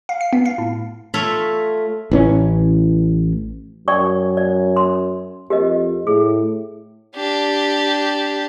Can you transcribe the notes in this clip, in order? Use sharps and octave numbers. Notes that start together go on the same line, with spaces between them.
F5
C7
B3
F5
A2
A3 F4 C#5 E5 F5
A1 E3 C#4
F#2 D5 G5 C#6
D5
C6
F2 G4 A#4 D#5
A2 G#4
D4 G4